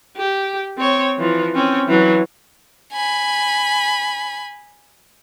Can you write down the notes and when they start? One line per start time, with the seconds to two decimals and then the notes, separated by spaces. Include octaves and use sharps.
0.17 G4
0.78 C4 C#5
1.18 E3 F3
1.55 C4 C#4
1.88 E3 F#3
2.93 G#5 B5